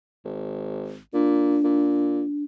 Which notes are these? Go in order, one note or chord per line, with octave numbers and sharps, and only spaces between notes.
G#1
A#2 D4
A#2